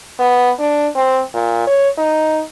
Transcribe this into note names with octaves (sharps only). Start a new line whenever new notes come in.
B3
D4
C4
A#2
C#5
D#4